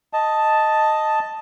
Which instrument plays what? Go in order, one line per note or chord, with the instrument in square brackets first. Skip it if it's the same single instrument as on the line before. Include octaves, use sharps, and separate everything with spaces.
[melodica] D#5 A5